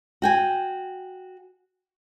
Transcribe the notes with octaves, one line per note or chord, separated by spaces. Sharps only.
F#4 G5 G#5